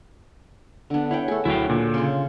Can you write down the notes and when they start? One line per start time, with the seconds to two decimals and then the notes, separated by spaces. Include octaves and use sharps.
0.90 D3 B3 D4
1.11 E4 C#5 F#5 G5
1.28 A3 G#4 A4
1.45 D2 F#3 E4 F#4 G5
1.70 A#2 D3
1.94 C#3 F4 G#4